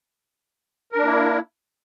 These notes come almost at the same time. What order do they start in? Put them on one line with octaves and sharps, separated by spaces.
A#4 D4 A#3 E4